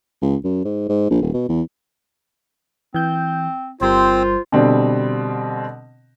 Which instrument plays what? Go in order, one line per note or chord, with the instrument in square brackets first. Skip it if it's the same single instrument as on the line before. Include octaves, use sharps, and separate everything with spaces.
[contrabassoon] C#2
F#2
G#2
G#2
A#1
D#1
B2
E2
[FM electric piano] E3 G6 [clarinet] C4
[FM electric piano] G1 G3 A#4 [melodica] C4 [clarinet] F4 [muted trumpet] C5
[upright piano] B2 D3 G3 C4